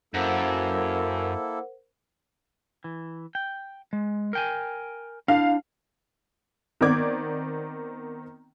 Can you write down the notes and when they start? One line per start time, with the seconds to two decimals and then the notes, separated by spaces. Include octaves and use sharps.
0.14 F#2 A#3 E4 A4 A#4 C5 F#5
2.84 E3
3.35 G5
3.93 G#3
4.33 A#4 G5 G#5
5.28 D4 E4 F5
6.81 D#3 B3 C4 D5 D6 G#6